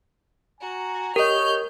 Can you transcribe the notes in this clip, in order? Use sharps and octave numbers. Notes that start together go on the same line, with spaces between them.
F#4 G#5 A#5
G4 A#4 C#5 D#5 F6 G6